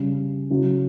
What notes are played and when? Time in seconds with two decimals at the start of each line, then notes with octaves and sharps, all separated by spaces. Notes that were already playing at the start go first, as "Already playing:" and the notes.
Already playing: C#3 G3
0.50 C#3 F#3